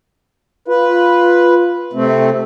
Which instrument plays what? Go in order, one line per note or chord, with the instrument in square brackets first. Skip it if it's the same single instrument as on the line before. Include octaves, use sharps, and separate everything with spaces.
[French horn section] F4 [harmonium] B4
[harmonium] C3 A3 C4